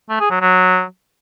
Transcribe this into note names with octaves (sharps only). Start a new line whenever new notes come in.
A3
G#4
F#3
F#3